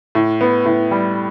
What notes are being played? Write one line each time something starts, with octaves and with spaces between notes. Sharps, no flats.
A2
B3
A2
G3